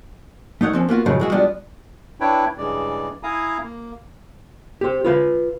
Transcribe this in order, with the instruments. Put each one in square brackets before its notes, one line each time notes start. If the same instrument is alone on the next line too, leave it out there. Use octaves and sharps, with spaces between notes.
[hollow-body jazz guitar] A3 D#4 C#5 F#5
F3 C4 C#4
A#3 B3 F4 F#4
F#2 A2 C#3 F3 F#3 G#3
E3 G#3 F#4
G3 G#3 B3 D4 F4 F#4
[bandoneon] D4 E4 B4 C#5 G5
G2 C#3 E3 G#3 D5
E4 F5 G#5 A#5 D#6
A#3
[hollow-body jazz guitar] G4 C5
F4 B4 F5